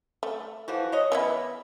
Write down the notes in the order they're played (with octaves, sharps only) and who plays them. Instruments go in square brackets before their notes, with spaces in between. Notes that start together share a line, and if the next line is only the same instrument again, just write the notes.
[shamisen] A3
[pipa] E3 F3 F#4
C#5 D#5
[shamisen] E3 B3 E4